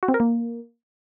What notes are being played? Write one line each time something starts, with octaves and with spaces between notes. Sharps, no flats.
F#4
C4
A#4
A#3